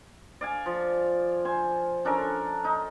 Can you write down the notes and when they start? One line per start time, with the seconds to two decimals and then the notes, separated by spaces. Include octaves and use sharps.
0.41 D5 F5 G#5
0.66 F3
1.45 C5 G#5
2.05 C#4 D4 A4 A#4
2.64 D#4